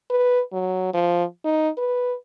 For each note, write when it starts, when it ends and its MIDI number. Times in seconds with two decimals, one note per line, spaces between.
0.10 0.41 71
0.52 0.89 54
0.94 1.24 53
1.44 1.69 63
1.78 2.15 71